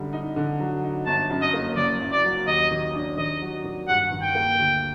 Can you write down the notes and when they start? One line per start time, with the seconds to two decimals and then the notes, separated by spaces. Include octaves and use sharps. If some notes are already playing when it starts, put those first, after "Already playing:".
Already playing: F#2 D3 G3
0.13 D#4
0.36 D3
0.60 F#3
0.83 D#4
1.06 G1 A5
1.30 F#2
1.42 D#5
1.53 A#3
1.76 F#1 D5
2.01 F#2
2.12 D5
2.24 F#3
2.47 D#2 D#5
2.71 D#3
2.95 D4
3.17 D#3 D#5
3.41 F#3
3.64 D#3
3.88 G2 F#5
4.11 D#3
4.23 G5
4.35 A#3
4.59 D2